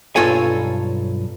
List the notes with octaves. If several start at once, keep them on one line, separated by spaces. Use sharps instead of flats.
B1 G2 F4 A4 C#5 G#5